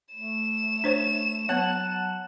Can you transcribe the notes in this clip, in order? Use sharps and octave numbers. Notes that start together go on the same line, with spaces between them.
A3 E7
D4 C5 C#5
F#3 B3 C#5 F#5 A5 F#6